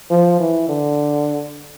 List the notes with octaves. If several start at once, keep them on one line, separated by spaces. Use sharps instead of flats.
F3
E3
D3